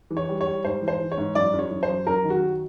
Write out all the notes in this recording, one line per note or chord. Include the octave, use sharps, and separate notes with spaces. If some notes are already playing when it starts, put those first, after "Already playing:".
E3
C#5
G3
C#5
G3
G#2 C5
E3
C5
E3
C#5
G#2
F#2 D5
F#2
C#5
F#2
C5
F#2
F#2 A#4
D#3
F#4
F#3